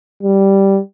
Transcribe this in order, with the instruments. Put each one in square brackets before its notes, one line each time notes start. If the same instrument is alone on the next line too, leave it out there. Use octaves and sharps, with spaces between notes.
[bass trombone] G3